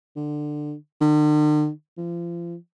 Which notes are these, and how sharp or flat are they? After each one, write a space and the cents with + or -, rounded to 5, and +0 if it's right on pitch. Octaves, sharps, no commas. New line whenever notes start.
D3 +20
D3 +45
F3 -35